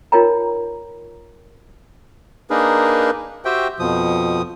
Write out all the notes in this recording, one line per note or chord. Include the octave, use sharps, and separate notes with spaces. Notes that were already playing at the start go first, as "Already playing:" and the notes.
D#4 F4 A#4 C#5 G5 A#5
A#3 D4 D#4 G#4 A#4 B4
F#4 G4 C5 E5 G5
F2 B2 F3 D#6